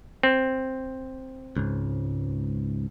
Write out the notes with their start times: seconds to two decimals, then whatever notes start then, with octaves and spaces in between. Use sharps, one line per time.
0.23 C4
1.57 C#2 G#2